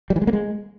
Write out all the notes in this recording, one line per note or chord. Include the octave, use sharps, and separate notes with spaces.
G3
E3
G#3
A#3
G#3